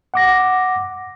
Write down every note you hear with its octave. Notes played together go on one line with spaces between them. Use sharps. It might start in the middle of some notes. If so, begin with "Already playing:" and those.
F#5 D6 A#6